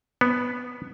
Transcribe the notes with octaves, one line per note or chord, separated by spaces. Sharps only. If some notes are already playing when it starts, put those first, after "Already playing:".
B3